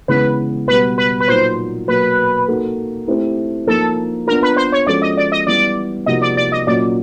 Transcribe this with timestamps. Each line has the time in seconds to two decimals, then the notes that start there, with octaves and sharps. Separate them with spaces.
0.08 C#3 E3 G#3 B3 B4
0.68 B2 G3 B3 B4
0.98 B4
1.20 B4
1.28 A#2 F#3 A#3 D#4 C5
1.87 B2 F#3 A#3 B4
2.48 A#3 D#4 F#4 A4
3.08 A3 C4 E4 G4
3.67 F3 A#3 D#4 A4
4.27 B3 D4 F4 A#4
4.43 B4
4.57 C5
4.72 C#5
4.87 F3 G#3 C#4 F#4 A4 D5
5.02 D#5
5.17 D5
5.32 D#5
5.47 E3 G3 B3 E4 D5
6.06 C3 F3 A#3 D#4 F#4 D#5
6.22 D5
6.37 D5
6.52 D#5
6.67 A#2 F#3 A#3 C#4 D5